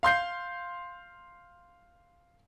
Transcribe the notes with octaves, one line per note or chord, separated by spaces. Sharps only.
F5 C6 G6 C7